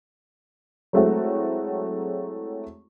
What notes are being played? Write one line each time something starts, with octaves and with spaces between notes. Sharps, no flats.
F#3 G#3 A3 C4 E4 F#4